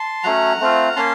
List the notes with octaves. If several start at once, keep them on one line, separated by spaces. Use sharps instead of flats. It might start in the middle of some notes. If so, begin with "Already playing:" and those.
Already playing: A5 C6
F#3 A3 C#4 F#5 A#5
A3 C4 F4
A#3 C#4 A5 C6